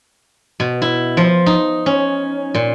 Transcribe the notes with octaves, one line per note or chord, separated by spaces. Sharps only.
B2
E4
F3
D#4
C#4
A#2